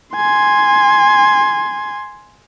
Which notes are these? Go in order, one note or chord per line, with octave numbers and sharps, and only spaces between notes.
G#5 C6